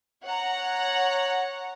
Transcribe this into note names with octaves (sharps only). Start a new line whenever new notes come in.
C#5 F#5 A#5